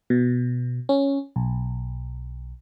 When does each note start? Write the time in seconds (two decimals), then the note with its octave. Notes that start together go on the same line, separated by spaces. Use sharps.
0.10 B2
0.89 C#4
1.36 B1